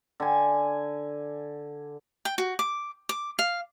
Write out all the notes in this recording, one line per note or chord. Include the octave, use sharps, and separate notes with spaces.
D3 G#5
G5
F#4
D6
D6
F5